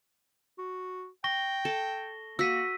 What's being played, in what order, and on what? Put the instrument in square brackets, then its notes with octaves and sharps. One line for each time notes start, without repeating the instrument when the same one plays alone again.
[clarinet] F#4
[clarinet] G5 [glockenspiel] C#6 A#6 G7
[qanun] A4
[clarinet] A#3 [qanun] F#4 [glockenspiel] E6 B6 D#7